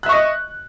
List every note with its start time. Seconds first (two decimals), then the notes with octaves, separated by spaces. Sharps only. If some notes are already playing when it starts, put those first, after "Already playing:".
0.03 F#6
0.06 E5
0.09 C#6
0.12 D#5